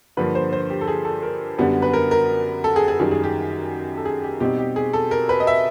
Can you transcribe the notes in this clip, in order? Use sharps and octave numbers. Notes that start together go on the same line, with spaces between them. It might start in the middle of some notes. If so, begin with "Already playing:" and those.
G2 D3 F3 A#3 B4
C5
C5
G4
A4
G#4
A4
A#4
F#2 D3 G3 B3
B4
A#4
A#4
A4
G#4
G#4
F#2 D#3 G3 G#4
G#4
G4
A4
G#4
G4
B2 G3 C4 D#4 G4
G4
G#4
A4
A#4
B4
D#5
E5